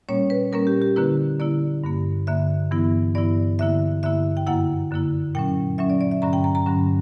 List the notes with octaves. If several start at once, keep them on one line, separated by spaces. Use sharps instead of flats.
A#2 G3 A#3 C#4 C#5
B4
A#2 G3 A#3 C#4 A#4
G4
G4
D3 A#3 E4 B4
D3 A#3 E4 D5
G2 D3 A#3
G2 D3 A#3 E5
G2 E3 B3 E4
G2 E3 B3 E4 D5
G2 D3 A#3 E4 E5
G2 D3 A#3 E4 E5
G5
F#2 D3 A#3 E4 F#5
F#2 D3 A#3 E4
A#2 F#3 C#4 G5
A#2 F#3 C#4 E5
D5
D5
E5
G2 D3 F#3 C#4 A#5
G5
A#5
A#5
G2 D3 F#3 C#4